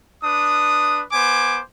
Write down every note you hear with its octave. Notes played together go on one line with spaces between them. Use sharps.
D4 B4 D#6
B3 C5 G#5 D6